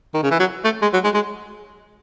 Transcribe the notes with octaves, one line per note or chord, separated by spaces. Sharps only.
D#3
C#3
E3
F#3
A3
G#3
F#3
G#3
G#3